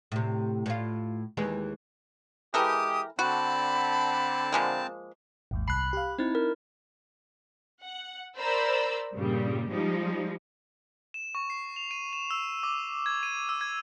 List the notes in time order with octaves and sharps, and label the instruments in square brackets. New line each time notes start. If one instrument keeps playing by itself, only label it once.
[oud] A2 C3
A2 F4
D#2 E3 G#3
[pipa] E3 A4 A#4 [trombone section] G#3 G4 [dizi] D#6
[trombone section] D3 [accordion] C4 A5 [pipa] F#4 [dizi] B5
[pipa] F3 G#3 A#3
[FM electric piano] G#1 D#2 G#2
[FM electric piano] C2 A5 C7 [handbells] B5 F#6
[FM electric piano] G4 F5
[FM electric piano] C4 [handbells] D#4 E4
[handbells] A#4
[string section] F#5
A#4 C5 D5 B5 E6
G2 A#2 C#3 G3
F3 G3 G#3 D#4
[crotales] E7
C#6
C7
F7
D#7
E7
E6
D6
G#6
D#7
E6
G#6